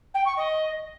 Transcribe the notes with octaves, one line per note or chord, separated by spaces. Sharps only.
G5
C#6
D#5